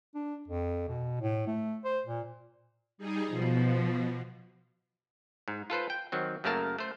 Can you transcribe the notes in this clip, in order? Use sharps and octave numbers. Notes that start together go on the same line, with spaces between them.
D4
F2
B2
A2
A3
C5
A#2
G3 D#4 G#4
B2 F3
G#2
F4 A4 B4 C5
G5
D#3 F#3 C4
F#2 C#3 A3 A#3 A#4 A5
A3 C5